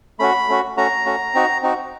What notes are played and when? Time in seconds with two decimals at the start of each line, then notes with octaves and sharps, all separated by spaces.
0.19 A3 C#4 F#4 B5
0.49 A3 C#4 F#4
0.77 A3 C#4 F#4 A#5
1.06 A3 C#4 F#4
1.34 C4 D#4 F#4
1.62 C4 D#4 F#4